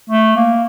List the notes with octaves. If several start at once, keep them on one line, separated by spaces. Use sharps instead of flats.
A3
A#3